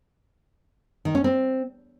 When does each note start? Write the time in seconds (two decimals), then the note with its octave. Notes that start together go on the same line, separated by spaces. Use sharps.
1.05 D#3
1.15 C#4
1.24 C4